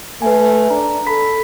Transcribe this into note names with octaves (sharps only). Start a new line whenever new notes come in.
A3 B4 G#5
D4 A#5
A4 B5 B6